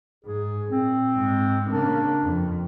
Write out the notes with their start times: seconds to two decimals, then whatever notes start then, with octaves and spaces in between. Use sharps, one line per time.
0.25 G#2 G#4
0.70 A#2 C4
1.16 G#2 G#3
1.70 C#3 A#3 D4
2.22 F2